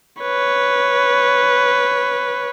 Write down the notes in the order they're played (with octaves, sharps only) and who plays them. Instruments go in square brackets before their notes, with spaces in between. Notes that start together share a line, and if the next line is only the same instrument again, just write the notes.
[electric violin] B4 C#5